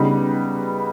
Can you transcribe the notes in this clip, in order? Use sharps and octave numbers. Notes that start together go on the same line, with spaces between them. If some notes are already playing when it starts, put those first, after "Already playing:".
Already playing: C#3 G3 B3 D#4 B4